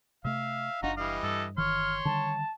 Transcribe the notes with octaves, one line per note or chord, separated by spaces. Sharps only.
C3 A3 E5 F5
F#1 D4 D#4 F4 F#4 A#5
E3 G3 D#5 F5
G2 A4
G1 D#3 E3 C#5 C6 F6
D3 D#3 G3 A5